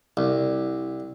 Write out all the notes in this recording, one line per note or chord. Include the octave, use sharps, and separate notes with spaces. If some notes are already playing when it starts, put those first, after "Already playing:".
C2